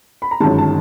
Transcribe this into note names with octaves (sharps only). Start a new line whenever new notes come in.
B5
A#5
G1 F#2 D#3 G#3 A5
A5